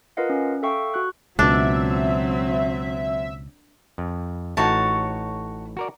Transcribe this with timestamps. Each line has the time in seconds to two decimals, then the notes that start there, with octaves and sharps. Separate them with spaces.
0.17 F4 A#4 B4 D#5 F5 F#5
0.30 C#4
0.63 A4 E5 F5 G5 C#6 E6
0.94 F#4 C#6 F#6
1.39 C#2 B2 F#3 C4 D4 E5
3.98 F2
4.57 A1 A2 D#4 F#4 C#5 A5
5.77 F#4 A#4 D5